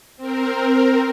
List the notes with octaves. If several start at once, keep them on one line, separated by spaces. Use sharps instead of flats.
C4 A#4